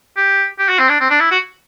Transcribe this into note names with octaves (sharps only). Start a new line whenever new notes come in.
G4
G4
F#4
C4
D4
C4
D4
E4
F#4